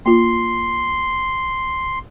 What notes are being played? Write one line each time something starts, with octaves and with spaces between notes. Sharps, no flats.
A#3 F4 C6